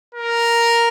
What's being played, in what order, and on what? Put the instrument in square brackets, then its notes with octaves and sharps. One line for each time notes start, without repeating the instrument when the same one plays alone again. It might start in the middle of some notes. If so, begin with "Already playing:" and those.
[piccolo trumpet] A#4